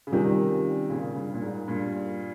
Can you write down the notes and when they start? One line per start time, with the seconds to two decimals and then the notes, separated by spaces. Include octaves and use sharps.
0.07 C#3
0.12 C3 D#3 G3 C#4 F4 A#4
0.90 A#2 C#3
1.16 G2
1.34 A#2
1.42 G#2
1.68 G2 A#2